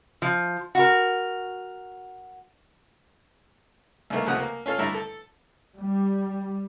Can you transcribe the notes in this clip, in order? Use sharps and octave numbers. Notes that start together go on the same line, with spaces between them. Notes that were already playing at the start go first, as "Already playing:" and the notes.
F3
F#4 A#4
C2 D#3 A3 A#3
C#2 C3 F3 A3 F#5 D#6
A#3
C#4 F4 A4
G2 D3 A3 E4 A4 A#5
A4
G3